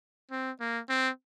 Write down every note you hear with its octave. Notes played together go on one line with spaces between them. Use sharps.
C4
A#3
C4